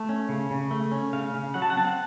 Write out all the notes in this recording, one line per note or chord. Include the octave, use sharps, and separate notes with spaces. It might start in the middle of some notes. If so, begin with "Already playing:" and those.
Already playing: A3 A5
C#4
C#3
C#3
A3
C#4
C#3 F5
C#3
F#3 F#5
A5
F#5
C4 A5
F#5